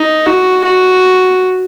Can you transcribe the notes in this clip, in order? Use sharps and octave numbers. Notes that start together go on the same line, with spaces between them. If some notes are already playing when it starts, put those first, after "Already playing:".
Already playing: D#4
F#4
F#4